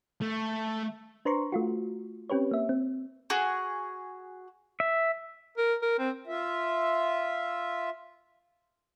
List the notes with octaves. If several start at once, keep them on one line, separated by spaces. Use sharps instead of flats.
A3
D4 B4 C5 A#5 C6 C#6
A3 F4 F#4
C4 C#4 G4 B4 C#5
A#3 E5
C4
F#4 G#4
E5
A#4
A#4
C4
F4 E5